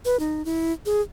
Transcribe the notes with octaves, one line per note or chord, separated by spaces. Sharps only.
B4
D#4
E4
G#4